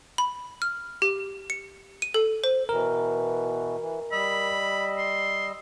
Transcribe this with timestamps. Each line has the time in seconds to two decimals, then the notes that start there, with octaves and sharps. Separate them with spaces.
0.18 B5
0.62 F6
1.02 G4
1.50 C#7
2.02 D#7
2.14 A4
2.44 C5
2.69 B2 E3 A#4
3.79 E3
4.12 G3 D#5 B5 E6
4.98 C6